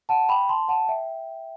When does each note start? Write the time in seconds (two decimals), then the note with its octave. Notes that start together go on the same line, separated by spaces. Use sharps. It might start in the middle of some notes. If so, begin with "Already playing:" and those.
0.09 F#5 A5
0.29 G5 B5
0.49 A5 C6
0.68 F#5 A5
0.88 E5 G5